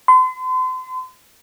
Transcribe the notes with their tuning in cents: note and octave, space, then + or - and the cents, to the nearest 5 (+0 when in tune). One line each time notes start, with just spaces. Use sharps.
C6 -40